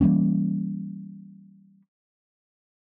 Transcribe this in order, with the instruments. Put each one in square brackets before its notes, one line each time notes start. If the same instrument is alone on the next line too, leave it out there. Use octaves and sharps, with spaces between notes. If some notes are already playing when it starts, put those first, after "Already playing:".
[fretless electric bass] E3 G3 A#3 C#4